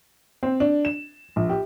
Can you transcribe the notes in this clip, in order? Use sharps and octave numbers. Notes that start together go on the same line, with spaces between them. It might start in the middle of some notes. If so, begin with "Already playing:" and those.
C4
D4
E7
A#1
G4